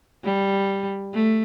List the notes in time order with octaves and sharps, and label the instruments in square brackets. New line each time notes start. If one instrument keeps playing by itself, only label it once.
[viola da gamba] G3
A3